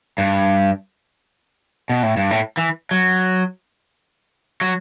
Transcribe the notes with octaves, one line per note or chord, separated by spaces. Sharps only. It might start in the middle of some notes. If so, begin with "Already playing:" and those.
G2
B2
A2
G2
A2
E3
F#3
F#3